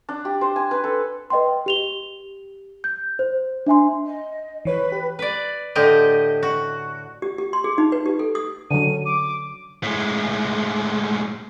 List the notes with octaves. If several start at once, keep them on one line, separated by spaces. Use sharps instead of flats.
D4
G4
C5
G#5
B4
A4
B4 D#5 G5 C6
G4 F7 G7
G6
C5
D4 E5 G#5 C6
D#5
E3 B4 C#5
G4
B4 D5
A2 D3 G4 D#5
F#4
G4
G4
C6
G#4
D#4
B4
G4
A4
D#6
D3 F#3 D#7
D6
A2 G#3